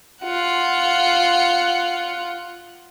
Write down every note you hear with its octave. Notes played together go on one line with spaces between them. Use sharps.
F4 F#5